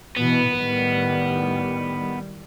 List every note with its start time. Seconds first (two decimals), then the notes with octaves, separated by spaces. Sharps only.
0.17 B2 E3 B3
0.56 A2 D#3 G3